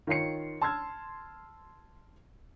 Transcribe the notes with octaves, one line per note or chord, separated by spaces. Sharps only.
D#3 F4 C#5 C7 C#7
A5 C6 E6 F6 G#6